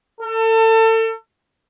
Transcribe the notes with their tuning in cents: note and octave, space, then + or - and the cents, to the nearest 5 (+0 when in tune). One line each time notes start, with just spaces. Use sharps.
A4 +30